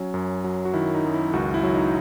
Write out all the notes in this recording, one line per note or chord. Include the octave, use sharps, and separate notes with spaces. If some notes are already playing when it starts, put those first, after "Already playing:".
Already playing: F#3 C#4
F#2
F#3
F#4
D#3 E4
D#4
F#2
E4
C#2 F#4
E4
F#3
D#4